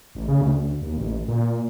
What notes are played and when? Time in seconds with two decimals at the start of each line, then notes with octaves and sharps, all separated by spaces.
0.15 A1
0.28 C#3
0.41 D2
0.81 D#2
0.97 A1
1.28 A#2